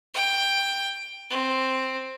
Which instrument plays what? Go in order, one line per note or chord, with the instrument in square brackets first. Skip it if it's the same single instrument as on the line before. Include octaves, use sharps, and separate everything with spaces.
[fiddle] G5
C4